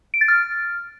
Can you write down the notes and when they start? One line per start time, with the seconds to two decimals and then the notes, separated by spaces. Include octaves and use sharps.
0.14 D7
0.21 A6
0.28 F6